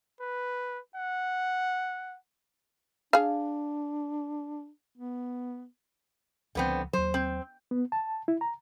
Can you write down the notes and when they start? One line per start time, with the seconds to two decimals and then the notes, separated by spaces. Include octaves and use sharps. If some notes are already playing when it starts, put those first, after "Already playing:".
0.20 B4
0.95 F#5
3.13 D4 G#4 F5
4.97 B3
6.55 C#2 D3 F3 B3 C4
6.93 D#2 F#3 C5
7.14 C4
7.71 B3
7.92 A5
8.28 E4
8.41 A#5